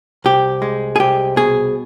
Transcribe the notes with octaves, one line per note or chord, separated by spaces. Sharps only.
C2 G4
G#3
G#4
C2 G4
B2 G#4